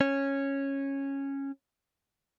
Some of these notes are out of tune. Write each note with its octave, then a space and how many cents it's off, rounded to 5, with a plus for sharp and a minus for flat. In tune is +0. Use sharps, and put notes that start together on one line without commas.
C#4 -10